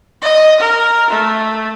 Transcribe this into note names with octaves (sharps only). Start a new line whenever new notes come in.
D#5
A#4
A3